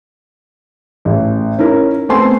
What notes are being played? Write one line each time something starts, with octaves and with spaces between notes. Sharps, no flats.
A1
C#4 D#4 E4 A#4
A3 B3 C4 C5 G#5 C6